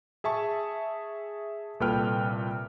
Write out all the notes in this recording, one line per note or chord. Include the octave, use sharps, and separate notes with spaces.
G#4 E5 A5 C#6
C2 A#2 A4 B4 G5 F6